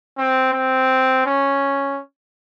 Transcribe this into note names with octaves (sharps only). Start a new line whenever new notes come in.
C4
C4
C#4